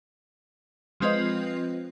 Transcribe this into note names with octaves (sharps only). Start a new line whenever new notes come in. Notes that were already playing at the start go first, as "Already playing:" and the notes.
F3 G#3 C4 F4 B4 D#5